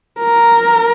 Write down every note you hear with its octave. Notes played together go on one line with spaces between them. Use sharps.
A#4